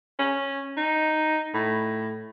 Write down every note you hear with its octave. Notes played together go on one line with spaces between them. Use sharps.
C#4
D#4
A2